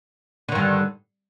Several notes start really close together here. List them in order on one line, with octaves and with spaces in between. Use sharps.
D3 D#3 G2